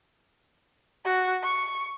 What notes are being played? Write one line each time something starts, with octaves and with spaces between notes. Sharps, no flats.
F#4
C#6